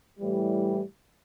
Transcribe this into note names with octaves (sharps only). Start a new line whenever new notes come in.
A2 E3 G3